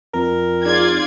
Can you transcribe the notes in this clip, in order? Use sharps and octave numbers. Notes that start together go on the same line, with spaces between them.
F2 A#4
D#4 F4 G#4 D5 G#6